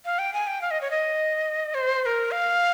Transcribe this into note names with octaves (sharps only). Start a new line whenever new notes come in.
F5
G5
G#5
G5
F5
D#5
C#5
D#5
C5
C5
A#4
F5